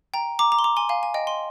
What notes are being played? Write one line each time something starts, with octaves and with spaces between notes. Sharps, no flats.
G5 A#5
A#5 D6
A#5 D6
C6
A#5 D6
G#5 C6
F5 G#5
G#5
D#5 G5
G#5 C6